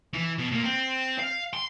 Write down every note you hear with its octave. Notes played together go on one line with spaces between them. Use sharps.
E3
B2
A#2 A#3
C4
F5
C6